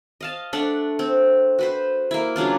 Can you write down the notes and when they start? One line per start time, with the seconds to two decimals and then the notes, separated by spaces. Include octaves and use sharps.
0.21 D#5 F5 A5
0.53 A3 D4 F#5
0.99 C4
1.59 F#4 B4 C5
2.11 A#3 E4
2.36 C#3 F#3 D4 F4